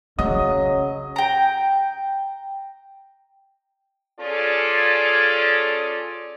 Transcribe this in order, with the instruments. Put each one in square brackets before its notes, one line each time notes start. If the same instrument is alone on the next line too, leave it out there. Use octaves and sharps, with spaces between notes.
[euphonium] C#3 [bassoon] F#3 [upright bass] C#4 [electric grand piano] D#5 D#6
[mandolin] G5 A#5
[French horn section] C#4 F4 G#4 A4 D5